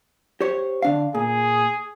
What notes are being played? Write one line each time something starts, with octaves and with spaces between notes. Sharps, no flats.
G4 C5 C#5
D3 D4 F5
A#2 G#4